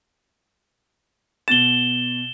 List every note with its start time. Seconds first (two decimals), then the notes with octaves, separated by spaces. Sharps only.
1.48 B2 A6 E7 G7